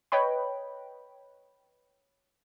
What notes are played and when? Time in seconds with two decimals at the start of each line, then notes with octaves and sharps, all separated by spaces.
0.12 B4 C#5 D#5 G5 B5